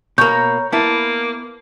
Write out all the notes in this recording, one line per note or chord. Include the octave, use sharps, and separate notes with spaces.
B2 A#3 C#5 A#5 G6
A#3 B3 E4 A5